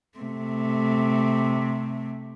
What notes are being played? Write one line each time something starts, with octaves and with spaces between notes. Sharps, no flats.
C3 A3